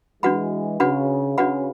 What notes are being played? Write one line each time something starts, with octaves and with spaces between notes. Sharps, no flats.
E3 G#3 D4 F#4 B4 F#5 B5
C#3 D4 F#4 B4 F#5 B5
C#3 D4 F#4 B4 F#5 B5